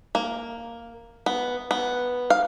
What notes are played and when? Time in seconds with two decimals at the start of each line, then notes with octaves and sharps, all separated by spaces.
0.15 A#3
1.26 B3
1.71 B3
2.30 F5